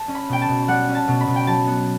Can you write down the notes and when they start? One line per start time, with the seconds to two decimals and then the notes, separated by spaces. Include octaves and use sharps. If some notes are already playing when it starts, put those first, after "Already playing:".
Already playing: A5
0.08 C#4
0.15 B5
0.29 B2 G5
0.42 A5
0.49 B2
0.68 G3 F#5
0.89 C#4
0.95 A5
1.08 B2
1.21 B5
1.28 B2
1.36 G5
1.47 F#3 A5
1.67 B3